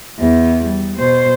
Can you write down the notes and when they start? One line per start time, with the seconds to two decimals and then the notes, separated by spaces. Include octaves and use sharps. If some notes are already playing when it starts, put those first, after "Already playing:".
0.19 E2 B3
0.65 G3
0.97 B2 C5